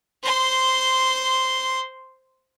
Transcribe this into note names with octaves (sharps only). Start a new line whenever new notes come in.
C5 C6